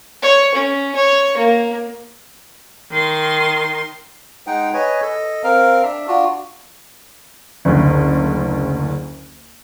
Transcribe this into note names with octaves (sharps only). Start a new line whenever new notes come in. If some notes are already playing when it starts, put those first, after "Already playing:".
C#5
C#4
C#5
A#3
D#3 C6
G#3 D#4 F#5 G5
B4 C#5 D#5 G#5
A4 D#5
C4 A#4 F5
D4 E5
D4 F4 F#4
F#1 D2